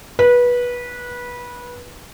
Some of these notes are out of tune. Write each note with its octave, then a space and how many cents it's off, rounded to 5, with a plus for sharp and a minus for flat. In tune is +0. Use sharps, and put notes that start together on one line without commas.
B4 -20